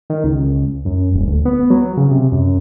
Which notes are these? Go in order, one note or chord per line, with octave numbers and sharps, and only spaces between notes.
D#3
C#2
F#2
D#1
D2
B3
F#3
C#3
C3
F#2